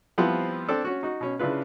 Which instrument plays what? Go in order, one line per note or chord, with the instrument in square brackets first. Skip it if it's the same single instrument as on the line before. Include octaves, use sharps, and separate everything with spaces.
[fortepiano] F3 G3 B3 C4 E4 F4
C4 D4 A4
C#4 F#4
D#4 F#4
B2 C#4
C#3 D4 E4 F4 B4